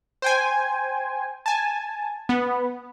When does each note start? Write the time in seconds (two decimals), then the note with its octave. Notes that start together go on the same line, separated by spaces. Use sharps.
0.22 C5 G5 G#5
1.46 G#5 A5
2.29 B3